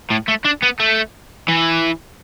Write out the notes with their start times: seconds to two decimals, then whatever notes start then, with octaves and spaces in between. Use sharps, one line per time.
0.10 A2
0.28 A3
0.45 D4
0.63 B3
0.80 A3
1.49 E3